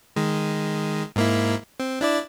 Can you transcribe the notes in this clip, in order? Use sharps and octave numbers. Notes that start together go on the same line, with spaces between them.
D#3 G#3
G#2 A#3 E4
C4
D4 E4 D5